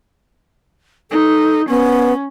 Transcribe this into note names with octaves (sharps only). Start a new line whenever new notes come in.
D#4 A4
B3 C#4